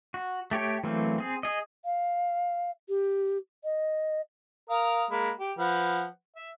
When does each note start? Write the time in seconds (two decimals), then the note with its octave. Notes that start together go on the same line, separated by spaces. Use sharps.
0.14 F#4
0.51 A3 G4 C#5 G5
0.84 E3 F#3 A3 A#3 C4
1.18 C4 G#4
1.43 G#4 D#5
1.85 F5
2.89 G4
3.64 D#5
4.70 A#4 F5 D#6
5.11 G#3 A#3 B5
5.39 G4
5.59 F3 B4 F#5
6.36 E5